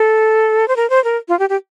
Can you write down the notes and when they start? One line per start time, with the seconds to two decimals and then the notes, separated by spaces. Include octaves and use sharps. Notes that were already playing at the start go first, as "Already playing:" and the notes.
Already playing: A4
0.68 C5
0.76 A#4
0.90 C5
1.04 A#4
1.28 F4
1.39 G4
1.49 G4